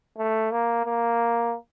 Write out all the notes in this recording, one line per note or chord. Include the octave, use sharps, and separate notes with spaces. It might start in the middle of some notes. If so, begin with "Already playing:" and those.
A3
A#3
A#3